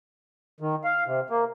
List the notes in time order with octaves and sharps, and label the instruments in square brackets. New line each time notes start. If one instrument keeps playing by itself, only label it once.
[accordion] D#3
F5
C3
A#3